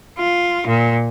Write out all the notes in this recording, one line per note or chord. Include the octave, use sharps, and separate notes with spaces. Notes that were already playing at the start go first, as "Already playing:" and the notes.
F4
A#2